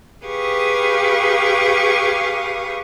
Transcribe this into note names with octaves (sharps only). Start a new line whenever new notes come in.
G4 G#4 B4 F5 C#6 D#6